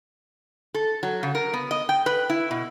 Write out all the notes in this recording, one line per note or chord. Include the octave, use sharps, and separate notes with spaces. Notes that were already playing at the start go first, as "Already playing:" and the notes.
A4
F#3
C#3
A#4
B3
D#5
G5
B4
E4
B2